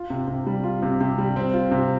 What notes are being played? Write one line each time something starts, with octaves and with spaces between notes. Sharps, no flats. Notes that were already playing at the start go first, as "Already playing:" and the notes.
Already playing: F4
C3
C3
G3
F4
C3
C3
G3
C4
F4
C3